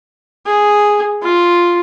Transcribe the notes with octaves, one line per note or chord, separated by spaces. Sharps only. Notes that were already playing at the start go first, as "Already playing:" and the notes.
G#4
F4